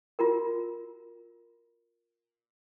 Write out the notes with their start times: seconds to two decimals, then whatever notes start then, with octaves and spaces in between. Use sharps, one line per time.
0.19 F4 F#4 A#4